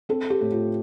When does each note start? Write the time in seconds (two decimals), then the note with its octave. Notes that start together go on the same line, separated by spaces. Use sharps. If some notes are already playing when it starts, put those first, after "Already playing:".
0.09 C4 A4
0.30 G4
0.41 A2
0.52 F4